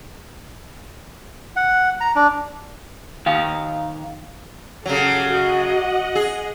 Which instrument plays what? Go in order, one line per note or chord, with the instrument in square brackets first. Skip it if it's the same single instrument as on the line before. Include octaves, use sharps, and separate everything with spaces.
[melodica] F#5
A#5
D4
[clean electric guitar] D#3 F5
[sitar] C#3 F#3 [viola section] G4 A4
[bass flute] F#4 [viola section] D#5 F#5
[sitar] G#4